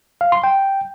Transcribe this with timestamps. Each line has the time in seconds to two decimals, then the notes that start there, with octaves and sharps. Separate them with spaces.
0.21 F5
0.32 C6
0.44 G5